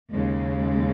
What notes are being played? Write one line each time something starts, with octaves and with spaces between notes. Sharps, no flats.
D#2 C#3 G#3